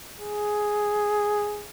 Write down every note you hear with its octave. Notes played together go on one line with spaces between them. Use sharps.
G#4